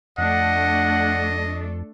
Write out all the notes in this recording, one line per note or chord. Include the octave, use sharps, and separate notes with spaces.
F2 A3 D4 A4 D#5 F#5